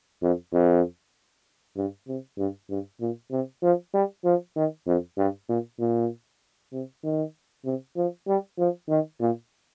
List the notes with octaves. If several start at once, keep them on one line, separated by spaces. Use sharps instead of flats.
F2
F2
G2
C3
G2
G2
A#2
C3
F3
G3
F3
D#3
F2
G2
A#2
A#2
C3
D#3
C3
F3
G3
F3
D#3
A#2